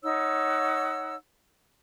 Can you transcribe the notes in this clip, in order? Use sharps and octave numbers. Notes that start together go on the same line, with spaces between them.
D#4 C#5 F#5 E6